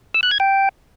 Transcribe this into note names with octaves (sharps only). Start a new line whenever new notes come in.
E6
F#6
G#6
G5